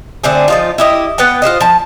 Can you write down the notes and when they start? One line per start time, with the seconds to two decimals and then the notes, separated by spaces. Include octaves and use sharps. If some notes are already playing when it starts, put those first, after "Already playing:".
0.24 D3 A3 C4 G#4
0.48 F3 D#4 F4
0.78 E4 G4 D#5
1.18 B3 B4 F#5 G5
1.42 F4 G#4 C5 D#5
1.60 F3 A5